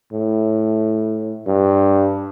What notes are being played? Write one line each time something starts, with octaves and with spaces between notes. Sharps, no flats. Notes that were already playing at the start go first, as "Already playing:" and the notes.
A2
G2